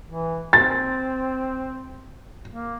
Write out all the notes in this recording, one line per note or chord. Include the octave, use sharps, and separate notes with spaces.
E3
C4 A6
A#3